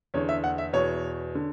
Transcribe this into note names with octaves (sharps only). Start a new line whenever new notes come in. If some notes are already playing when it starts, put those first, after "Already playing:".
E2 D3 C#5
E5
F#5
E5
E2 B2 C#5
D3